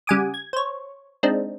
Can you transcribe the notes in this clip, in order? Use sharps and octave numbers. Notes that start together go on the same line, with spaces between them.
C#3 G3 F#5 G#5 D6 D#6
G#6
C5 C#5
G#3 C4 D4 D#4